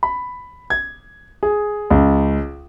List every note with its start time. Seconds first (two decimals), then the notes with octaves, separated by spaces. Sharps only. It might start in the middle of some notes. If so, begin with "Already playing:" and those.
0.03 B5
0.70 G#6
1.43 G#4
1.91 C#2